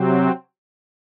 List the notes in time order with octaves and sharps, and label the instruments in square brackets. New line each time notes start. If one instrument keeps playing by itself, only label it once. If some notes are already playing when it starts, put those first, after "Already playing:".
Already playing: [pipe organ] C3 F#3 C4